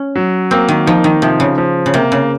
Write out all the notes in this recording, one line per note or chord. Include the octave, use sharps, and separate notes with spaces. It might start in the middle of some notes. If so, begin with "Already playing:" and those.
Already playing: C#4
F#3
A#3 C4
D#3
F3 D#4
D#3
C3 F3
C#3
F3
C#3
C3 A#3
C#3